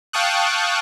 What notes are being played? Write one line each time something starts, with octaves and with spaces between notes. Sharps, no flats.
F5 G5 A5 C#6 D#6 F#6